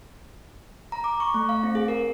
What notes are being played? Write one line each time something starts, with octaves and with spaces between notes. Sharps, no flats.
A#5
D6
C#6
A3
F5
C4
G#4
A#4